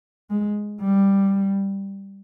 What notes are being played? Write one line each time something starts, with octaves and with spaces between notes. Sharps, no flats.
G#3
G3